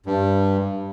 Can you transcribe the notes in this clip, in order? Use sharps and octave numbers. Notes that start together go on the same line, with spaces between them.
G2